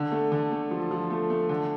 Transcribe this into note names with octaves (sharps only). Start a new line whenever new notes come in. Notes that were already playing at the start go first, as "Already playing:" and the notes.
Already playing: D3
A3
D3
A3
F3
F3
A3
A3
D3